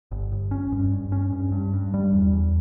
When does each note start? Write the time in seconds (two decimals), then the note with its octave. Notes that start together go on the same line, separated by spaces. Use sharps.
0.11 G1
0.32 G1
0.51 C#4
0.72 G2
0.92 G2
1.12 C#4
1.32 G2
1.52 G2
1.73 G2
1.94 G3
2.14 E2
2.33 E2